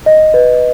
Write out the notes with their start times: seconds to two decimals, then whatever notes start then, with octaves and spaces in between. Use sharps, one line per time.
0.06 D#5
0.34 B4